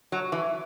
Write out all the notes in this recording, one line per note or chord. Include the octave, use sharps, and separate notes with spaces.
F#3
E3